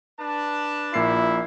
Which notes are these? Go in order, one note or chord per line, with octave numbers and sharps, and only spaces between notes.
D4 B4 A5
A#1 A#2 E4 C7